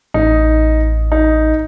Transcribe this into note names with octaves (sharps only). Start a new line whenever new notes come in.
A1 D#4
D#4